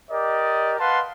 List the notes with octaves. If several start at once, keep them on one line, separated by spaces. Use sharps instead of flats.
G4 A#4 D5 D#5
B4 F5 F#5 A5 C6